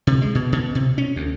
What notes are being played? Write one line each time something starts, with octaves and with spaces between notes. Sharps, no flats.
C3
G#3
B2
B2
C3
C#4
D2